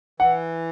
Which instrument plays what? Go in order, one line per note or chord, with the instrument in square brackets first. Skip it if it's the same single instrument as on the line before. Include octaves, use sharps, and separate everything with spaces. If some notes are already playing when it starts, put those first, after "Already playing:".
[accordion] E3 [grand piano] F#5